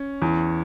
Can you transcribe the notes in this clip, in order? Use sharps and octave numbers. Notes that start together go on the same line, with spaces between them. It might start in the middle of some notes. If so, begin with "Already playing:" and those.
Already playing: C#4
E2